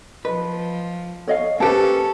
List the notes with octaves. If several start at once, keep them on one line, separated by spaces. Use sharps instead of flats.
F3 B4 D#5
C#5 D#5 F5
A#3 C#4 G4 A4 B4 C5 A5